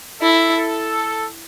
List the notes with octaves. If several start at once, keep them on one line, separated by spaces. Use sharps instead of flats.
E4 A4
A4